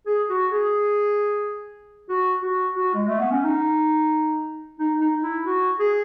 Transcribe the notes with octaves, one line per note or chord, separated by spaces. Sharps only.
G#4
F#4
G#4
F#4
F#4
F#4
G#3
A3
B3
C#4
D#4
D#4
D#4
E4
F#4
G#4